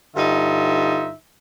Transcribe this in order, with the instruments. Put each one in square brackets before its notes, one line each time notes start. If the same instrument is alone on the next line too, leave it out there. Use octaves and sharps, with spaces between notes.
[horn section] G2 D3 D#4 F4 E5